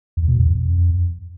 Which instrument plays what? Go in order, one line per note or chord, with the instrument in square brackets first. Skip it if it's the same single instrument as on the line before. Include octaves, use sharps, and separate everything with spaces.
[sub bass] E2
B2
E2
F2